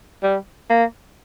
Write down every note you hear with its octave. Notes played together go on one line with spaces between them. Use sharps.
G3
A#3